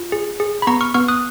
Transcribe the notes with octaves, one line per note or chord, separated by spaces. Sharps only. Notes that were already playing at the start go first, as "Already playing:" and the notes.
Already playing: F4
G#4
G#4
B5
B3 A#5 C#6
C#6 F6
B3 C#6 F6
D#6 F#6